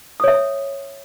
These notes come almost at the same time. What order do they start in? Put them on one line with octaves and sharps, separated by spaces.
D#6 C#5 E5